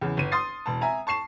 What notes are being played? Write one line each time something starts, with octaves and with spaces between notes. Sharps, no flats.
E2 C#3
G1 D#7
C6 D#6 A6 C7
E1 A5
E5 G#5 A#5
A5 C#6 C7 E7